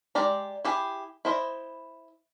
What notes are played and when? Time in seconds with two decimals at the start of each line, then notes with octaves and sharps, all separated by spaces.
0.15 G#3 G4 D5 A#5
0.65 E4 G4 G#4
1.25 E4 C5 D#5